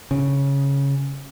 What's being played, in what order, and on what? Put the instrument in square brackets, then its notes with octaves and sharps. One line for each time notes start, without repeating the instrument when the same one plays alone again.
[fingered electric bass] C#3